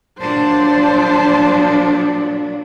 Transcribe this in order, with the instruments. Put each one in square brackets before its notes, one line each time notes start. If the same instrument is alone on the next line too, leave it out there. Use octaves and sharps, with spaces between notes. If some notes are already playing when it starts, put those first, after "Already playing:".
[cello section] A#2 F#3 D4 [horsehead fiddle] C5 A5